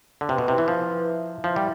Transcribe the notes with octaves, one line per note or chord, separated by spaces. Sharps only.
D3
C3 B4
B2
C3 E4
E3
F3 E4
E4
E5
E5
F3 E4
G3